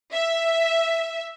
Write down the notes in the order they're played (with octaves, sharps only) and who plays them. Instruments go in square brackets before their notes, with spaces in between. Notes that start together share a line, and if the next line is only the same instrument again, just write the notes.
[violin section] E5